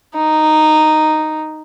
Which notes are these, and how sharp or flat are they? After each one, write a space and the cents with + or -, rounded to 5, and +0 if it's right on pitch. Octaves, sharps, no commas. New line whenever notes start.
D#4 -5